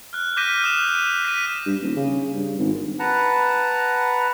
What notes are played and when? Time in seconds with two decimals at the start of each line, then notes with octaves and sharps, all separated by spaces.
0.13 F6 F#6
0.37 D6 F6 G6 A#6 B6 D#7
0.64 D#6 E7
0.95 D#7
1.25 B6 D#7
1.66 G2
1.82 D#1
1.96 C#3
2.34 G2
2.58 G#1
2.99 B4 F#5 A5 A#5